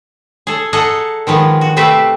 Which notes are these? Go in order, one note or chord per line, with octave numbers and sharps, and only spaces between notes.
G#4 A4
G#4 A4 D#5 F#5 A5 A#5
D#3 F3 G#3 B3
F#4
C3 A3 C4 B4 E5